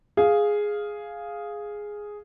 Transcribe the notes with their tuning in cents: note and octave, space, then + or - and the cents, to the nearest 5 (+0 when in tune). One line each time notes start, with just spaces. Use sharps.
G#4 +0 F5 +0